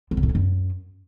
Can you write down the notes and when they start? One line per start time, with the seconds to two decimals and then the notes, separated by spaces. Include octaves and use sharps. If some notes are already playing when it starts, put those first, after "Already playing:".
0.11 F#2
0.17 C#3
0.23 A2
0.29 D#3
0.35 F#2